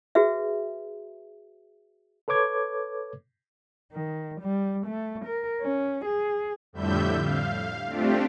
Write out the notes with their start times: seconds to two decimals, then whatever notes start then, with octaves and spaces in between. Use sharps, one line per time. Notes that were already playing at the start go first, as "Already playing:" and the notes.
0.15 F#4 G#4 B4 E5
2.28 A4 B4 C#5 D6 G#6
3.92 D#3
4.40 G3
4.86 A3
5.25 A#4
5.61 C#4
6.05 G#4
6.73 F2 A2 D3 G3 E5 G6
7.21 F5
7.86 A3 C4 D4 F4 G4